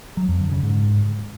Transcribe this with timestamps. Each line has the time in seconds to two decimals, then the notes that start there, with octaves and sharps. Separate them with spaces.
0.17 F#3
0.29 F2
0.40 D3
0.52 C#3
0.63 G#2